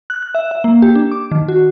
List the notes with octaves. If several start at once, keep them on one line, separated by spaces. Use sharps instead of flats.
F#6
F#6
E5
E5
A#3
G4
D4
D6
D#3
F#4